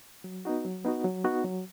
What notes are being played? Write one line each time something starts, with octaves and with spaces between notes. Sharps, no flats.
F#3
B3 D#4 F#4
F#3
B3 D#4 F#4
F#3
B3 D#4 F#4
F#3